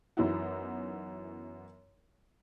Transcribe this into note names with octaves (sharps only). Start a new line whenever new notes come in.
F#2 E3 B3 D#4 E4 F#4